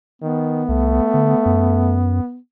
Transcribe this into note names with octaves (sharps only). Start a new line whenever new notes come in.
D#3 B3
C2 A3
D3
F#2